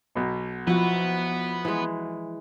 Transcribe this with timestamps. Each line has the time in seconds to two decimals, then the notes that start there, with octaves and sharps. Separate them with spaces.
0.16 B1 B2
0.67 F3 B3 E4 F#4
1.65 E3 G#3